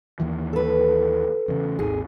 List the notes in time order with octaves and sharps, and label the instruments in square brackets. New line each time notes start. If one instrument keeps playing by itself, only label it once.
[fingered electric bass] D#2 D#3 E3
[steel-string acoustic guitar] A4 B4
[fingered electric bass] E2 C#3
[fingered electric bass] G#1 D#2 [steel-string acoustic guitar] G#4